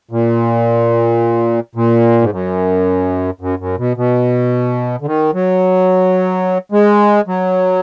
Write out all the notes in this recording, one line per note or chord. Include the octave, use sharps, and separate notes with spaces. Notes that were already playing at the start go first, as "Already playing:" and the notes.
A#2
A#2
G#2
F#2
F#2
F#2
B2
B2
D3
D#3
F#3
G#3
F#3